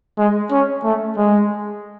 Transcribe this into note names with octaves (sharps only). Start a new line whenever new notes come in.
G#3
C#4
A3
G#3